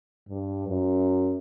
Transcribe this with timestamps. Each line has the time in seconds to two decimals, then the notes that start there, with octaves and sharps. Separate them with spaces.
0.29 G2
0.69 F#2